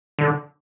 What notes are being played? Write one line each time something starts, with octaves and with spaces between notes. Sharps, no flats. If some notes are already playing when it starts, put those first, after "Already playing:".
D3